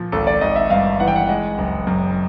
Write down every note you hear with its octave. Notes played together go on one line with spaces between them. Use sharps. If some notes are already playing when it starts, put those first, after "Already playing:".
Already playing: A#2 F3
G#1 A4
D5
G#1 D#5
E5
G2 F5
E3 F#5
G5
F#5
G#3
F#1
F#2